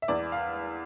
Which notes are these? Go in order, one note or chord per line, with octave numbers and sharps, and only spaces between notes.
E5
E2 D5
F5